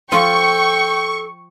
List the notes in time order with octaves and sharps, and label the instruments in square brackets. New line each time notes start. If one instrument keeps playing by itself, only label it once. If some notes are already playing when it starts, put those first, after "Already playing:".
[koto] F3 F4 [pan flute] A4 [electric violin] G5 [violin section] C#6